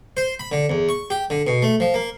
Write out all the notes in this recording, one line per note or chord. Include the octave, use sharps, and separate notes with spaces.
C5
B5
D3
E2
C#6
G4
D3
B2
A3
F3
A#3